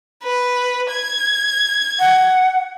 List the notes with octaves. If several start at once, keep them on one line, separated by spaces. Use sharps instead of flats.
B4
G#6
F#5